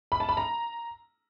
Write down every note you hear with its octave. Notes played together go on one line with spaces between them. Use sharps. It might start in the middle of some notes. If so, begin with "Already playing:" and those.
B5
A5
B5
A#5